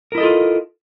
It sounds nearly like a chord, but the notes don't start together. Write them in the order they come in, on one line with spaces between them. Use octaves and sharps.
A#4 E4 D#5 A4 F4